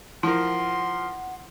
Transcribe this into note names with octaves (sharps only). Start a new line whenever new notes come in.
F3 E4 A#4 F#5 C6